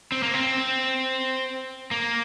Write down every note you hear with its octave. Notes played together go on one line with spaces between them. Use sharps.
C4
A#3
C4
A#3